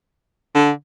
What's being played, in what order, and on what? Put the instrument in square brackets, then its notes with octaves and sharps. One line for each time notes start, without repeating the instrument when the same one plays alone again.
[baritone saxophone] D3